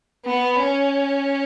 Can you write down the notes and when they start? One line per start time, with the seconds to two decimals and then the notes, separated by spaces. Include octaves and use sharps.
0.25 B3
0.60 C#4